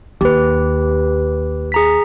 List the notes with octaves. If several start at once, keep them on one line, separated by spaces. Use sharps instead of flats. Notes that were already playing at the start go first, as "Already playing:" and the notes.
D#2 G4 B4
G#4 A#5 B6